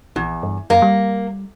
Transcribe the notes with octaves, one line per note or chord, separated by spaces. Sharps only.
A#1 E2
G2
F#2 A#3
G3